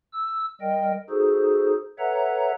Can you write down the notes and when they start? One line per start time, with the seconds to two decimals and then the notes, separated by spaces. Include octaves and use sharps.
0.13 E6
0.61 G3 A#4 D#5 G5
1.10 D#4 F#4 G#4 A4 C5
1.99 A4 B4 C#5 E5 F#5 A#5